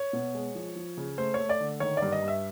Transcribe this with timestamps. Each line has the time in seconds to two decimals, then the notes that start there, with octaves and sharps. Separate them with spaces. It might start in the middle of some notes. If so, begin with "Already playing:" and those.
Already playing: C#5
0.13 B2
0.34 G#3
0.55 F3
0.76 F3
0.97 C#3
1.18 A3 C5
1.34 A3 C#5
1.49 D5
1.60 D3
1.80 D#3 C#5
1.97 G2 D5
2.12 D#5
2.22 G2
2.28 E5